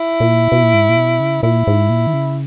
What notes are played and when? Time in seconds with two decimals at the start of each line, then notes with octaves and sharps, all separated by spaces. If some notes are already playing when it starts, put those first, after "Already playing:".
Already playing: E4
0.20 A#2
0.52 B2
0.63 A#2
0.74 G#2
0.89 A#2
0.96 B2
1.20 C#3
1.43 A#2 E4
1.67 G#2
1.90 A#2
2.07 D#3
2.14 C#3